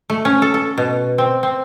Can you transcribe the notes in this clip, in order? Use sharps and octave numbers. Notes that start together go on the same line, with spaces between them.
A3
C#4
A4
A4
B2
C4
C4